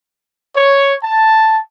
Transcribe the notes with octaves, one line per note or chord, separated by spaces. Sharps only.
C#5
A5